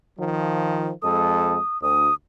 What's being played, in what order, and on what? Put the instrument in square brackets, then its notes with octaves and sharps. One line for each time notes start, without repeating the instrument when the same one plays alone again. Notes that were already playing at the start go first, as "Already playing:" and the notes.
[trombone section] D#3 F3
[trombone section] F2 G#3 A4 [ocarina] D#6
[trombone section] D2 [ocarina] D#6